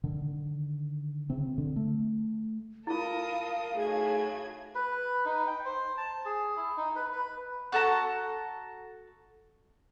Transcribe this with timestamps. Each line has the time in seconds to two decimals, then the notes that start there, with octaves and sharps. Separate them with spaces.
0.04 D3 D#3
1.30 C#3 C4
1.58 D3
1.76 A3
2.87 E4 F4 A4 A#4 F5 D#6
3.76 A2 A3 D#4 F#4 G#4 G#6
4.75 B4
5.25 D#4
5.47 G5
5.65 C5
5.97 A5
6.25 G#4
6.56 E4
6.77 D#4
6.96 B4
7.13 B4
7.72 F#4 A4 A5 A#5